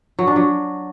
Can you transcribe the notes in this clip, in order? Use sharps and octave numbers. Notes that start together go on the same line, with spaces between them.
F#3
D4
F#3